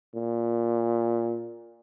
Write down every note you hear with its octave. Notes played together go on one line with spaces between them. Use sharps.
A#2